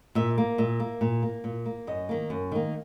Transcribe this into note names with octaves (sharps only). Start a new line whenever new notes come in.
A#2 E5
A#3
A#2 E5
A#3
A#2
A#3
A#2
A#3
F#2 D#5
D#3 A#3
F#2
D#3 A#3